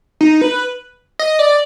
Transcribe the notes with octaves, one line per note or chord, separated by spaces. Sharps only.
D#4
B4
D#5
D5